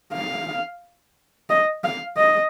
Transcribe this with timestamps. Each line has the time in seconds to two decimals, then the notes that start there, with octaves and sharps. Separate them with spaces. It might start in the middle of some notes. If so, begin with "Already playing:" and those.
0.13 F5
1.49 D#5
1.84 F5
2.17 D#5